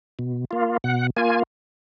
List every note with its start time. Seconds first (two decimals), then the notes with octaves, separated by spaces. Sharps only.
0.19 B2
0.51 A#3 F4
0.84 B2 F#5
1.17 A#3 F4 G#5